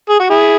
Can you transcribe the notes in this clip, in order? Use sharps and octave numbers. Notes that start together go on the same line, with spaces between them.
G#4
F#4
E4 G#4